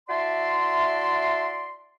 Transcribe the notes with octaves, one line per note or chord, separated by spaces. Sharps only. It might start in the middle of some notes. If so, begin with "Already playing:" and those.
E4 F#4 D5 E5 A5 C6